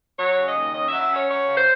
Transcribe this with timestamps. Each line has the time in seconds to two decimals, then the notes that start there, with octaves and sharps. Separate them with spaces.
0.18 F#3 C#5
0.36 C#3
0.46 D#5
0.55 D#2
0.73 C#4 D#5
0.88 E5
0.92 F#3
1.01 E5
1.10 C#4
1.15 C#5
1.28 F#3 C#5
1.47 C#3
1.57 C5